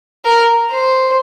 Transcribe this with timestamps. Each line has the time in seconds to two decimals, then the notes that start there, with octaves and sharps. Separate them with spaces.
0.25 A#4
0.71 C5